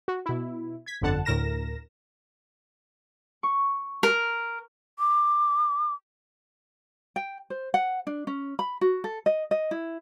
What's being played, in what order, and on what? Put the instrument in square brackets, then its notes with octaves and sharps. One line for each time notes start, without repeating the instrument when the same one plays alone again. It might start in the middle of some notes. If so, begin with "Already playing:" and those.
[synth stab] F#4
B2 E4
G#6 B6
G1 F2 D3 F#5 A5
D2 A2 A#4 A#6 E7
[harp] C#6
[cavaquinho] A#4
[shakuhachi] D6
[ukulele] G5
C5
F#5
D4
C#4
B5
F#4
A4
D#5
D#5
E4